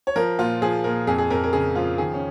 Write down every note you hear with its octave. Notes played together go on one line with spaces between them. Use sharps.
C#5
F3 A#4
A#2 F4
F3 G#4
A#2 A#4
F2 G#4
G#4
F2 A#4
A#4
C#3 G#4
F3 F4
D#3 G#4
C#4